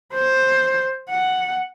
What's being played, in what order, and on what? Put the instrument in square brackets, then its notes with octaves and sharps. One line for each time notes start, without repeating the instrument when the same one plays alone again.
[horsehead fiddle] C5
F#5